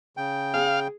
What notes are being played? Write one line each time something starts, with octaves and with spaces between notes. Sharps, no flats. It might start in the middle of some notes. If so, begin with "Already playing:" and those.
C#3 G5
G#4 F5